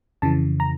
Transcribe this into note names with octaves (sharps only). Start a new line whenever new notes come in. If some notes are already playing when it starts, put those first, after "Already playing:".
F2 C#3 E3 A5
A#5